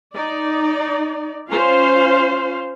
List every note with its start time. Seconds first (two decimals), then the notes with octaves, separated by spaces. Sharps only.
0.14 D#4 D5
1.50 C#4 F4 C5 F5